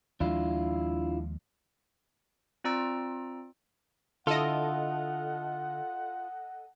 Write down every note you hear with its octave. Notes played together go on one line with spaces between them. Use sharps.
D#2 F3 G#3 D4 E4 F4
C4 F4 D5 A#5 E6 D7
D3 E4 F4 A4 D#5 F#5